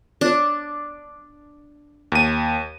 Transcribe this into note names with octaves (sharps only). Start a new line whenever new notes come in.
D4
D#2 D#7